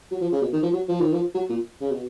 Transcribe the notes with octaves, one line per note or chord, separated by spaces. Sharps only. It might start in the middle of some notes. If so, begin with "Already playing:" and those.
F#3
F3
C#3
B2
D#3
F3
F#3
F3
D#3
F3
F#3
A#2
C#3
B2